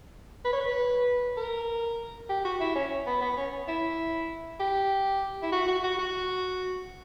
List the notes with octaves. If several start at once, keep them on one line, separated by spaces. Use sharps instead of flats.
B4
C#5
B4
A#4
G4
F#4
E4
C#4
B3
B3
C#4
E4
G4
E4
F#4
F#4
F#4
F#4